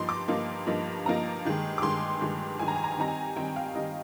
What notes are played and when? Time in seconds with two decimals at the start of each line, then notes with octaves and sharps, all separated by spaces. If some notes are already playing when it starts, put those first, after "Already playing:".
Already playing: G2 F3 A#3 D#4 C6
0.09 D6
0.28 G2 F3 A#3 D#4
0.67 G2 F3 A#3 D#4
1.05 G2 F3 A#3 D#4 A#5
1.45 G2 D#3 G#3
1.78 D6
1.82 G2 D#3 G#3 C6
2.21 G2 D#3 G#3
2.59 G2 D#3 G#3 G#5
2.68 A#5
2.76 G#5
2.84 A#5
2.92 G#5
2.98 D#3 G3 C4 D#4 A#5
3.08 G#5
3.36 D#3 G3 C4 D#4 G5
3.56 F5
3.75 D#3 G3 C4 D#4 D#5